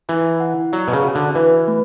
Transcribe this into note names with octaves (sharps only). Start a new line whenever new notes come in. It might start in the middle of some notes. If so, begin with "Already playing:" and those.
E3 E4
F#5
F#3 D5
B2
C#3
F#4
D3
E3 B4
A3